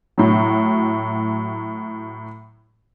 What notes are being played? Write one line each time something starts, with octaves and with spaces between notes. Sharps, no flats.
A2 F#3